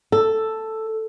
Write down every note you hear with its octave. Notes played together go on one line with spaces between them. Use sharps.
A4